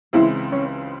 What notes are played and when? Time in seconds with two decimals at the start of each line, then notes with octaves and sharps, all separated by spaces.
0.13 C#2 C#3 E3 G#3 C4 E4
0.52 C#4